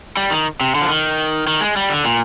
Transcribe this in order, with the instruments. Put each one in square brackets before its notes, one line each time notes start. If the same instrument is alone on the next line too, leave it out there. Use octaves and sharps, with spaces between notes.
[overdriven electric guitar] G3
D#3
C3
D3
F3
D#3
D#3
G#3
G3
D3
A#2